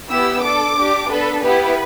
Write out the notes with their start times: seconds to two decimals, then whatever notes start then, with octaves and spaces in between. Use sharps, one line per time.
0.10 B3 E4 G4 E6
0.43 D4 A4 D6
0.77 D4 G4
1.09 B3 D4 A4 B4
1.42 B3 E4 G4 B4